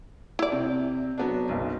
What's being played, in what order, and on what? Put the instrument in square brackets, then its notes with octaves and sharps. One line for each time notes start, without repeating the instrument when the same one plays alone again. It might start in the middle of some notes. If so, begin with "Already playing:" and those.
[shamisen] E4 D5
[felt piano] C3
F#3 B3 D4
F#1 B1